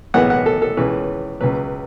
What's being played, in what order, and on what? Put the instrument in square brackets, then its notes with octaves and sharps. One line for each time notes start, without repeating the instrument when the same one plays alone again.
[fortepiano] B1 A2 E3 G#3 B3 F#5
F#5
A4
A4
C#2 C#3 E3 B4
C#2 C#3 F#3 B4